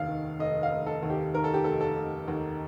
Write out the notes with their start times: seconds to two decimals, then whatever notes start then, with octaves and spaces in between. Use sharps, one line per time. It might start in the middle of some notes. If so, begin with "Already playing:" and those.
Already playing: F1 D#2 F5
0.08 D#3
0.40 F1 D#5
0.63 F5
0.72 F1
0.87 A4
1.03 D#2
1.10 G4
1.34 D#3 A#4
1.44 A4
1.54 G4
1.64 F1 A4
1.81 A4
1.96 F1
2.28 D#2